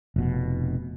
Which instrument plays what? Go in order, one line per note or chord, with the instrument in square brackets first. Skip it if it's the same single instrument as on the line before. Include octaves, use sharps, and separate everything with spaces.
[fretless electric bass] F1 B2